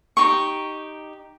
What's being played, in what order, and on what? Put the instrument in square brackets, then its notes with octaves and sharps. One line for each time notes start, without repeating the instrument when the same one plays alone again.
[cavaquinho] D#4 G4 C#6